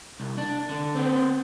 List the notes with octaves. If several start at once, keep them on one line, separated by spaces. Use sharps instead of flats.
C2
D4
D3
B3 C4